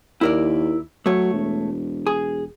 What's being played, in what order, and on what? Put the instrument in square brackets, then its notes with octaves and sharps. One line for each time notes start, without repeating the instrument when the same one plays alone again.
[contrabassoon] D#2 [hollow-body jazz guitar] E4 A#4 D5
[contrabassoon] F#3 [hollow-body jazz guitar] A3 C#5
[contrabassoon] E1
[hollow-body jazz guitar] G#4